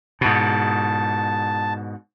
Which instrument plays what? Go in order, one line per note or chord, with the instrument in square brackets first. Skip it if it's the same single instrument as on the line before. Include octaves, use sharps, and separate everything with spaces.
[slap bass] G#2 B2 [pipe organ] A5